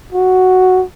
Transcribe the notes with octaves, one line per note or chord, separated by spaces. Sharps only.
F#4